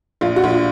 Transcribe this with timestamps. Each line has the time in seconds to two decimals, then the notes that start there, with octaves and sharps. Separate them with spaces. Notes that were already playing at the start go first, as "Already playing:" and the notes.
0.21 A#1 F4
0.36 F#4
0.44 A#1
0.50 F4